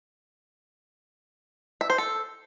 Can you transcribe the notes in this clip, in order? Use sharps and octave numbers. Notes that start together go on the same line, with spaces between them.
E5
C5
A4